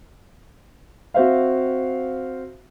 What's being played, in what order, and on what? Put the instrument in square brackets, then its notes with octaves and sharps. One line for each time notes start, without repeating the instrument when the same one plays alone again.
[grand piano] C4 F#4 C5 E5 F5